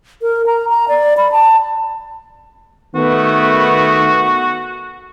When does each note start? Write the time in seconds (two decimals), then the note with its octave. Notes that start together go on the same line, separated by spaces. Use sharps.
0.22 A#4
0.46 A#5
0.69 A#5
0.88 D5
1.17 B5
1.32 A5
2.95 D#3 A3 B3 F#4